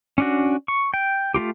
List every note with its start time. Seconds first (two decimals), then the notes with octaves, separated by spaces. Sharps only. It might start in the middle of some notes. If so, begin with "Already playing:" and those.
0.18 C#4 D4 F#4
0.68 C#6
0.94 G5
1.34 A3 A#3 F4 G4